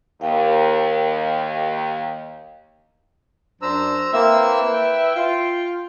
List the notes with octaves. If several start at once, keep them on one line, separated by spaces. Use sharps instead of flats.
D#2 F5 G5
F#2 D4 C5 A#5 E6
A#3 C4 E4 B4 E5 E6
G5
F4